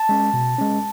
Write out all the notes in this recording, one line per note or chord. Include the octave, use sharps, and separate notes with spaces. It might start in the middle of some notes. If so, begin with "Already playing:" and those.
Already playing: A5
G#3 C#4
B2
G#3 C#4